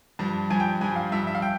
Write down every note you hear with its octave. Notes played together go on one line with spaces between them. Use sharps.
G2 F3
G2 F3 G#5
G5
G2 F3 G#5
F5
G2 F3 E5
E5
F5
G5